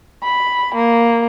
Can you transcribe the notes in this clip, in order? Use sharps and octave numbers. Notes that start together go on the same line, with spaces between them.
B5
A#3